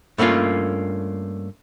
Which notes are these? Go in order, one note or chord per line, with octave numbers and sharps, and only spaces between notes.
G2 A3 A#3 C#4 F4